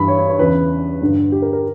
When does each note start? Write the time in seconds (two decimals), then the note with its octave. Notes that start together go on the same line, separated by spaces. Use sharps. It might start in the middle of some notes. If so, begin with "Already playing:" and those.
Already playing: G2 E3 B5
0.08 C#5
0.18 C#5
0.29 C#5
0.39 E2 C#3 E3 B4
1.02 G2 D3
1.32 G4
1.42 A#4
1.53 A#4